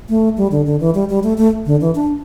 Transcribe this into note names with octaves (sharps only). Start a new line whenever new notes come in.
A3
G3
D3
D3
E3
G3
G3
A3
A3
D3
E3
D4